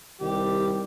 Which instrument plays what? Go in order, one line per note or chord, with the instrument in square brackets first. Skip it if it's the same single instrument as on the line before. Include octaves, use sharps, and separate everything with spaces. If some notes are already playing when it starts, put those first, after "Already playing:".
[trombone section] C2 D#3 G3 [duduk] G4